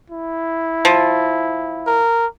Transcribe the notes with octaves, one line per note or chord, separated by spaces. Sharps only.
E4
F3
A#4